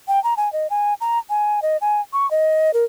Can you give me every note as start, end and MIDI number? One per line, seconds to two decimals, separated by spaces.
0.08 0.22 79
0.24 0.34 82
0.37 0.51 80
0.53 0.67 75
0.70 0.94 80
1.01 1.19 82
1.30 1.60 80
1.62 1.77 75
1.81 2.01 80
2.13 2.29 85
2.31 2.71 75
2.74 2.85 70